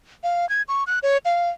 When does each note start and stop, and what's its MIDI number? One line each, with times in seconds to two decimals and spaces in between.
0.24 0.48 77
0.49 0.62 92
0.68 0.84 85
0.87 0.99 90
1.03 1.17 73
1.25 1.50 77